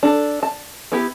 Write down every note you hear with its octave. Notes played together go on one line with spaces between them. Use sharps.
D4 A4
A5
B3 E4 G4